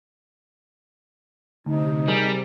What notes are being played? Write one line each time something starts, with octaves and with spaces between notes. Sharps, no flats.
D2 C3 D#4
G3 G#4 A#4